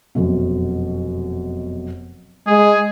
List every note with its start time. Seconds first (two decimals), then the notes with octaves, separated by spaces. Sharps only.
0.15 F1 F#2 B2
2.47 G#3 G#4